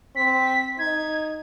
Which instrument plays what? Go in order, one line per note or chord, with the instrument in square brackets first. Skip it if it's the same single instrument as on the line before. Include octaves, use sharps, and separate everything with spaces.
[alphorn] C4 [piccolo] B6
[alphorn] D#4 [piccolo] G#6